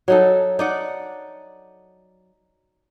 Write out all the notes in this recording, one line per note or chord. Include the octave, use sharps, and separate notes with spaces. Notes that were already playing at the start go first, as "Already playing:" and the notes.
F#3 D#4 A4
D#4 D5 F#5